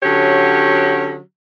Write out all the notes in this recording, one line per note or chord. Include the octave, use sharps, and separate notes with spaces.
D3 F#3 C#4 G4 C#5